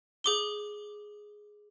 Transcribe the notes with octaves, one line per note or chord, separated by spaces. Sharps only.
G#4 D6 G7